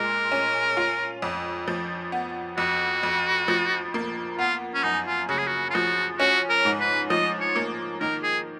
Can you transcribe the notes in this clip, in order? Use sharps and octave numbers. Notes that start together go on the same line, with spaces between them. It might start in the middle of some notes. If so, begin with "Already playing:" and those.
Already playing: A#2 G#3 A#4
C#4
F4
F2
F3
B3
F2 F#4
F2
F3
A#3
B3 F4
C#4
F#2 D#4
F4
C#3 F#4
G#4
F#4
F4
F3 F#4
C#4 F#4
A#4
G#2
B4
F3 D#5
C#5
A#3
D#3 A#4
G#4